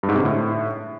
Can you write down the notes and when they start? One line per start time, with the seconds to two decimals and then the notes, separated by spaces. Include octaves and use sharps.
0.03 G2
0.09 G#2
0.14 C3
0.19 D3
0.25 A2